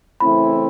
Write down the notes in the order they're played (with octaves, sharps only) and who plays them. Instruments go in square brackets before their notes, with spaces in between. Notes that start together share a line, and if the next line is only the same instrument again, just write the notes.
[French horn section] C#3 E3 A3 C4 E4 [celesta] B5